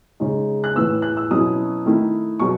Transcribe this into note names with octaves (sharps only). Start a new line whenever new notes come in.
C#3 G#3 D#4
F#6
A2 E3 B3 E6
F#6
E6
B2 F#3 C#4 E4 D#6
D#3 A3 E4
B2 F#3 C#6